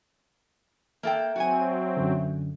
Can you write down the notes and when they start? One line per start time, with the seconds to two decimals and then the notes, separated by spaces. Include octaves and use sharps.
1.03 A#3 A4 E5 G5
1.36 F#3 C4 F#4 G#4 G#5
1.97 F#2 D3